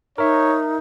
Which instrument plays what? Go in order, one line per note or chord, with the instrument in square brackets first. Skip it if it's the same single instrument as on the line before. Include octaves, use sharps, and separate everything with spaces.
[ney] D#4 [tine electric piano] A#4 E5 [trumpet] C#5